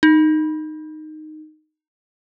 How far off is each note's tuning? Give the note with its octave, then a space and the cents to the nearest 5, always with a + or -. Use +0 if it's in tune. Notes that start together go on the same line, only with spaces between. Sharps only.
D#4 -10